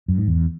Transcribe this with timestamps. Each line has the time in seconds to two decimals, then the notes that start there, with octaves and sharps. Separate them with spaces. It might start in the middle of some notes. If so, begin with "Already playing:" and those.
0.08 F#2
0.18 G#2
0.28 E2